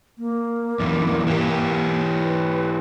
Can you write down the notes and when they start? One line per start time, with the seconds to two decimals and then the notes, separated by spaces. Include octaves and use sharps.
0.18 A#3
0.80 E2 G2 E3
1.27 E3 G4
2.13 B4